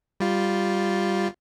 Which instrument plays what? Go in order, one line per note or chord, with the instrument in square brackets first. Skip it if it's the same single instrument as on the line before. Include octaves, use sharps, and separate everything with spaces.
[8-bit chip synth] G3 F4